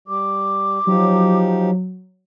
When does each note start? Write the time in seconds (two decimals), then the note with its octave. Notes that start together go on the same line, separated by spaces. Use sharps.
0.08 G3 D6
0.87 F3 F#3 D#4 G4